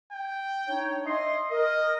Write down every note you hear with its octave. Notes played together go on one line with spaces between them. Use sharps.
G5
D4 D#4 C#5
D#5 E5 C6
A#4 D#5